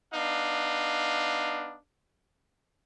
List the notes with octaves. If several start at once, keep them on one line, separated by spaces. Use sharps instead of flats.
B3 D4 D#4 F5